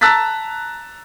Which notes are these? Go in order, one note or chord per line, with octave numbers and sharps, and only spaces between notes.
A5 A#5 E6 F#6 A6 B6